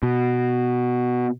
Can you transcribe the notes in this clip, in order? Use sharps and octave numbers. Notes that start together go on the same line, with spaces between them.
B2